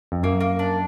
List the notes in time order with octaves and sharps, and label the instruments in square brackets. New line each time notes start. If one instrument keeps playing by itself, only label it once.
[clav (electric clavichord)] F2
[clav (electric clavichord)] F#2 [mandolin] A#3
[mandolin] A#3
D4